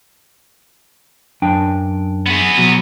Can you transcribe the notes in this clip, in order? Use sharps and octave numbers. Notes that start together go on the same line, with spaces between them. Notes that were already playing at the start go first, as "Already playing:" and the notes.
F#2 D4 G5
B3 G#4
B2 F#3